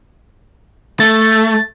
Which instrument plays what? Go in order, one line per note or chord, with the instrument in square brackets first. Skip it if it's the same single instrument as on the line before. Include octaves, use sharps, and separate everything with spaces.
[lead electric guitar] A3 [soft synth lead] A6